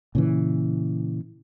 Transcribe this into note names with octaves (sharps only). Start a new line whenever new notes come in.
A#2 C#3 E3